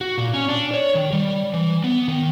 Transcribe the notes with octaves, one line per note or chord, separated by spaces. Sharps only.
F#4
A#2
C#4
D4
C#5
D#3
G3
E3
B3
D#3